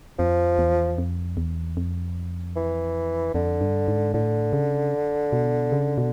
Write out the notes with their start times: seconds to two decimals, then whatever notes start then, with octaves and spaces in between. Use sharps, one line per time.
0.19 F2 F3
0.58 E2
0.98 F2
1.37 E2
1.77 F2
2.56 E3
3.34 F2 D3
3.61 G2
3.88 G#2
4.14 A2 D3
4.53 C#3
5.33 B2
5.72 C#3
5.98 B2